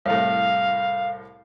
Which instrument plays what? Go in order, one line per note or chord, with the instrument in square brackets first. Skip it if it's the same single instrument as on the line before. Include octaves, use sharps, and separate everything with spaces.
[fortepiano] C2 A2 [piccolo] F5